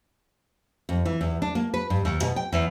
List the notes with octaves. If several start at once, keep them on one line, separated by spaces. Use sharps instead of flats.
F2
E3
E2
D4
A#3
B4
G2
D#2
B2
G5
E2